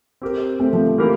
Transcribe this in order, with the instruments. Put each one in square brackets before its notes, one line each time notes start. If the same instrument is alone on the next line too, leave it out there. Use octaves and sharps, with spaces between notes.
[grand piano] C4 G4 A#4
[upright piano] A3 C4
F3 A3
[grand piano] E3 A#3 E4 G4 A#4